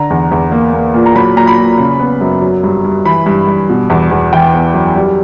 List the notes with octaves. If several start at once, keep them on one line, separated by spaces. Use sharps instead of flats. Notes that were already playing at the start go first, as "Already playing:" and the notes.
Already playing: D3 A#5
E2
E2
A#3
A#3
A#2
A#5
F#3 B5
A#2 A#5
B5
A#2
C#3
B3
F#2
F#3
G2
G2
E3 B5
G2
G2
B2
E2
E2
E3 G5
B3
F#2
G3